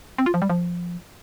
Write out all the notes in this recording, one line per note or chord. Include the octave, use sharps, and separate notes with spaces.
C4
F4
F3
G3
F3